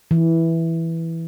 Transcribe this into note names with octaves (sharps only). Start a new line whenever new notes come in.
E3